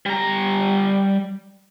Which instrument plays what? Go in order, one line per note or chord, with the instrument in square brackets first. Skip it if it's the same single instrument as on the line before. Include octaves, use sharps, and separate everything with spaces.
[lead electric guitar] G3 A#5